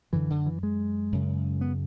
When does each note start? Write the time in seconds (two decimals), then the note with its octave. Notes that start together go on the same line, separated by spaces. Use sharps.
0.13 F#2 D3 E3
0.30 D3
0.46 E3
0.63 G#3
1.12 F#2 C#3
1.61 B3